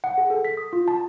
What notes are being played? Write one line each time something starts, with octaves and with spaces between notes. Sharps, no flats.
F#5
G#4
A4
B6
D#6
F4
A5